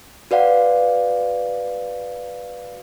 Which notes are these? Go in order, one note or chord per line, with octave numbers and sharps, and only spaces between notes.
F#4 B4 D5 F5 F#5